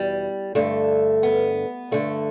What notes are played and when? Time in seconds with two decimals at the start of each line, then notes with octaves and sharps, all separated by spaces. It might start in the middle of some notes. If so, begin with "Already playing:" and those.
Already playing: E2 B2 G3
0.55 G2 D3 A3
1.23 B3
1.91 G2 D3 A3